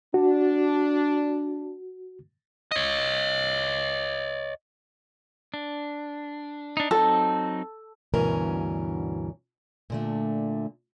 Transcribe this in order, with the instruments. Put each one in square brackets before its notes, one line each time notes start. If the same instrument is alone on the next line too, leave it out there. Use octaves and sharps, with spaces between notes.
[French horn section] D4 [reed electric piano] F#4
[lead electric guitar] C#5 D#5
[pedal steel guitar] D4
D4 D#4
[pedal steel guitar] F#3 C4 D#4 [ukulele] A4
[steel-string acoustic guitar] D2 G2 B2 E3 C#4 A#4
A#2 D3 A3